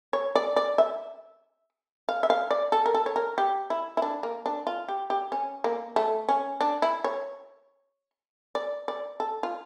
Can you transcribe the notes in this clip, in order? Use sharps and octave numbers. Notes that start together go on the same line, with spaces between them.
C#5
D5
D5
E5
F5
E5
F5
D5
A4
A#4
A4
C#5
A#4
G4
E4
E4
D4
A#3
D4
F4
G4
G4
C#4
A#3
A3
C#4
D4
E4
C#5
D5
D5
A4
F4